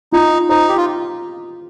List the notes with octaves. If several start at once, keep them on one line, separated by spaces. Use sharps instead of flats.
D#4 F4
D#4 C5
G4
F4